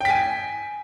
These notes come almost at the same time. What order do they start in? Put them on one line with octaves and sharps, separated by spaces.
G5 B6 G#5